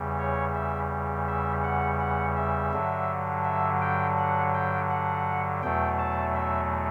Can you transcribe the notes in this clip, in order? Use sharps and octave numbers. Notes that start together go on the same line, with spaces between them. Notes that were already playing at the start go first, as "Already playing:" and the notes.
Already playing: E2 C#3 G3
C#5
E5
E5
F#5
F#5
E5
G2 D3 F#3
E5
G5
F#5
G5
F#5
E2 B2 F#3 A3 G5
A5
E5